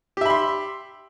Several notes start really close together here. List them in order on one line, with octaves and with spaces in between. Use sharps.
G4 E5 B5 C6